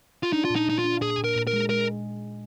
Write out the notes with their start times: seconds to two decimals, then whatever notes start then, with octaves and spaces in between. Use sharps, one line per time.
0.23 F4
0.33 D4 D#4
0.45 F4
0.50 A#2
0.56 D#4
0.67 A#2 D#4
0.79 F4
0.84 D4
1.01 A#2 G#4
1.18 A#2
1.24 A#4
1.36 A#2
1.47 A#4
1.53 G#3
1.69 G#3 A#4